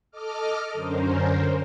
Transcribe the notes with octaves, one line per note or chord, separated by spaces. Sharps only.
A4 D#5 D6 F6
F#2 D3 C#4 A#4 C5